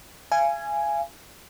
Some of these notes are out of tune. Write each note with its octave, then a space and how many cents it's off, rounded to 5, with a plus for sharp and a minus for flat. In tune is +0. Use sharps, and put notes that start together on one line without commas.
F5 -40 G#5 +0